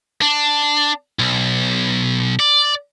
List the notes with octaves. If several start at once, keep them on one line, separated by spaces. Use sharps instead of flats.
D4
B1
D5